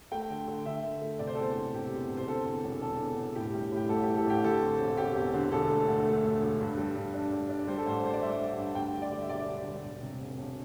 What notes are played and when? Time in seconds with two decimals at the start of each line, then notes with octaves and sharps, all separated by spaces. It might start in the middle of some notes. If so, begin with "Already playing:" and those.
0.12 A3 G5
0.30 D3
0.48 D3
0.66 D3 E5
0.84 A3
1.01 A3
1.19 C3 D5
1.27 C5
1.35 A4
1.38 E2 C5
1.56 E1
1.74 C3 G4
1.92 E2
2.10 C3
2.17 C5
2.27 D3 A4
2.46 E2
2.64 E1
2.82 E2 A4
2.99 E2
3.17 E1
3.35 A2 G4
3.54 G3
3.72 A2 G4
3.89 A1 A4
4.03 G4
4.08 E3
4.17 A4
4.26 A1 G4
4.44 D3 A4
4.62 C4
4.79 E1
4.97 E1 G4
5.16 E2
5.34 D3
5.52 E1 A4
5.70 A3
5.88 D2
6.05 A3
6.24 D2
6.42 E1
6.60 G2
6.77 G3
6.96 G2
7.14 D4
7.32 G3
7.49 D4
7.67 G3 C5
7.77 A4
7.86 A1 C5
8.04 G3 C5
8.14 D5
8.21 G3 E5
8.40 G3
8.57 G2
8.75 D2 G5
8.94 D3
9.02 D5
9.12 G3
9.21 E5
9.29 E1 D5
9.48 D3
9.66 G3
9.84 E1
10.02 C3
10.20 E1
10.38 E1